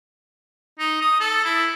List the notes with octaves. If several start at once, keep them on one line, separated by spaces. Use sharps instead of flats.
D#4
D#6
A4
E4